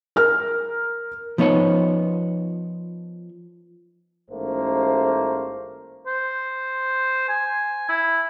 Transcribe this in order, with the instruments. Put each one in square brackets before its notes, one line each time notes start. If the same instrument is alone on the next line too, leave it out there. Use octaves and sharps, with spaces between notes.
[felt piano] A#4 F6
[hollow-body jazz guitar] F3 B3 D#4 C#5
[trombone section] A1 G#2 A3 A#3 C5
[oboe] C5
G#5
E4